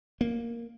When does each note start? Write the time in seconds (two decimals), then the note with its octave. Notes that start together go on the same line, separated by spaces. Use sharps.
0.21 A#3